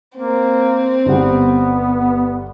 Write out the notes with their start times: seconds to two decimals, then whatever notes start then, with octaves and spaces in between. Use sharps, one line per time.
0.17 A#3 C4
1.06 G1 G3 B3 F#5